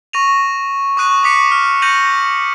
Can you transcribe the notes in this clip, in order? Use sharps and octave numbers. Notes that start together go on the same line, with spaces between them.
C#6 A#6 D#7 F7
C#6 D#6 F#6 D#7
C#6 D6 B6 C#7 D#7
F6
G6 A#6 C#7 D#7 F7 F#7